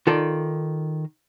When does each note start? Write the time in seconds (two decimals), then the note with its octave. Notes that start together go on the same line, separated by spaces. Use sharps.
0.07 D#3 F4 A4 D5